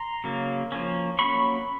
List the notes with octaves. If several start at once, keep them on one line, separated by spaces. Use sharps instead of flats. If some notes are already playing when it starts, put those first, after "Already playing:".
Already playing: A#5 C6
C#3 F#3 A#3
F3 A#3 C#4
F#3 A#3 C#4 B5 C#6